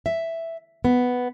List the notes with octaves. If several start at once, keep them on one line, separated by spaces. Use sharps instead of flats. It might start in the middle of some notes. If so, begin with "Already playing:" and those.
E5
B3